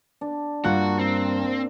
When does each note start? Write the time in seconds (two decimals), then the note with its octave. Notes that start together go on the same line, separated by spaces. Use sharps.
0.21 D4
0.65 G2 A#3 F4 F#4 F#6
0.99 C4